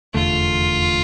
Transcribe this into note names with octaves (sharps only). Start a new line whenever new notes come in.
F1 E2 D3 A3 F4